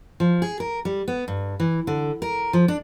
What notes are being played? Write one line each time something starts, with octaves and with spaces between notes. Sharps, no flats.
F3
G#4
A#4
G3
B3
G2
E3
D3
A#4
F3
D4